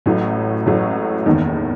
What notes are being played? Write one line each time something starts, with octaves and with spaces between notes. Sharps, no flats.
A1 A2 F#3
A1 A2 F#3
F#1 E2 D#3